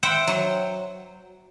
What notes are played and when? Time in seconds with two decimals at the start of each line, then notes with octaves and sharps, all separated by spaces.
0.03 C5 E5 F#5 G5
0.27 F#3